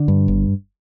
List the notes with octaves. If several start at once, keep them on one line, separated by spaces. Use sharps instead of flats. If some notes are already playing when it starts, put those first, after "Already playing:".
Already playing: D3
G2
G1